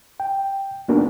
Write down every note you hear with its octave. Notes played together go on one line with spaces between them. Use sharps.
G5
A#3 B3 D4 D#4 F#4 A#4